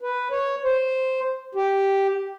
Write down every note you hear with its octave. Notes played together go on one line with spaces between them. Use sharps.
B4
C#5
C5
G4